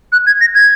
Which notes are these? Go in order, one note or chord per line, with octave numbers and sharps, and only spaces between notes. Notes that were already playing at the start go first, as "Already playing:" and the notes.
F#6
G#6
A#6
G#6